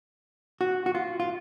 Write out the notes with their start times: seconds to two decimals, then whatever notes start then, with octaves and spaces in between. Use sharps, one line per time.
0.61 F#4
0.86 F#4
0.95 F4
1.20 F4